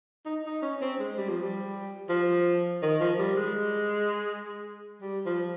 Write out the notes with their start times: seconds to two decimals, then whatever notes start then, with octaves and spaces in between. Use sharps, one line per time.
0.26 D#4
0.46 D#4
0.62 C#4
0.81 C4
0.99 G#3
1.17 G3
1.29 F3
1.42 G3
2.09 F3
2.82 D#3
3.00 F3
3.18 G3
3.37 G#3
5.02 G3
5.26 F3